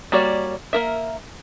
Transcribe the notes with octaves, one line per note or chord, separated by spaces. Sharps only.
G3 A#3 F#4 C#5 D5
A#3 A#4 E5